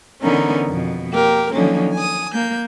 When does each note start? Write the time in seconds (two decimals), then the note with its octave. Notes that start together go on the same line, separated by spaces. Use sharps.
0.21 D3 E3 B3 C#4 D#4 A#4
0.68 F2 B2
1.10 A#3 G4 A#4
1.51 D3 D#3 F3 F#3 A#3 C#4
1.93 G#5 D#6
2.34 A#3 G6